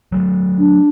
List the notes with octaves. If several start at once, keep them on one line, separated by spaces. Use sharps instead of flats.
F#3 A3
D4